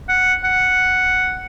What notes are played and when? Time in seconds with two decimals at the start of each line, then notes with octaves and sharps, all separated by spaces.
0.09 F#5
0.44 F#5